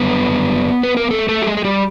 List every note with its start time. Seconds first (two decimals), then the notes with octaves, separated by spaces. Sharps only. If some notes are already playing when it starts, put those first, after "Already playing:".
Already playing: F#2 D3 G3 B3 B4
0.83 B4
0.97 A#4
1.11 A3 A4
1.29 A3 A4
1.42 G4
1.46 G#3 G#4
1.57 G#4
1.64 G3 G4